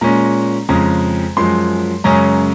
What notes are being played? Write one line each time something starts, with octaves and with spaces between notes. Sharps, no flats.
A#2 G#3 C#4 A#5
F2 C#3 G#3 A#5
F#2 F3 G#3 C6
F#2 C#3 G#3 C#4 A#5